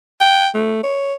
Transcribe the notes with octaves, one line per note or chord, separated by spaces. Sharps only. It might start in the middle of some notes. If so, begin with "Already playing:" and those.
G5
A3
C#5